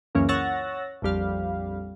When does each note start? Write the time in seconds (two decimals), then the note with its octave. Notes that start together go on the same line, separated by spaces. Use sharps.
0.15 C#2 F#2 E3 A#3 C#4
0.29 C#5 F#5 E6 F#6 A6 A#6
1.02 A#1 F2 G3 F5